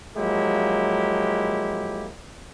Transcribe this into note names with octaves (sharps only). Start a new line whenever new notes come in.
F3 F#3 G#3 A#3 E4 G4